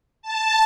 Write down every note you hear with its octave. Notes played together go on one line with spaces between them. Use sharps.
A5